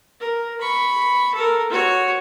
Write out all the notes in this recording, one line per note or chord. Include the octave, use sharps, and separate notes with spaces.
A#4
B5 C#6
A4 A#4
F#4 C#5